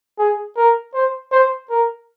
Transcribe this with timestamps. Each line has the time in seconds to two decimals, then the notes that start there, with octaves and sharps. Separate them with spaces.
0.19 G#4
0.57 A#4
0.94 C5
1.32 C5
1.70 A#4